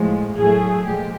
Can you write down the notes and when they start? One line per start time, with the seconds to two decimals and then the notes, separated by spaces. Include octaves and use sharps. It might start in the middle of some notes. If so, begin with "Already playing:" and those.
Already playing: A2 F3 G#3
0.35 A2 F#3 A3 G#4
0.83 A#2 F3 G#3 G4